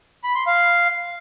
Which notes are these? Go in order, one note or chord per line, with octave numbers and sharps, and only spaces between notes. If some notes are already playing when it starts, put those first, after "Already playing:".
B5
C6
F5